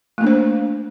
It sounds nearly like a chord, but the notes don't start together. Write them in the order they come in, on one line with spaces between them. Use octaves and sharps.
A3 A#3 D4 C5